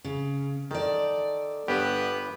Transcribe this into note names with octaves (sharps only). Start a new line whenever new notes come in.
C#3
D#3 A4 D5
G1 G2 B3 G4